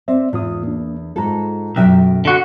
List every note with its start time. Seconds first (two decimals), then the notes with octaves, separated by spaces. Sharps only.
0.08 C4 C5 D5 E5
0.33 E2 G#2 F4 D#6
0.63 A#3 D4
1.16 G#2 F4 A4 A#5
1.76 B1 F#2 E5 G5
2.25 D3 F#4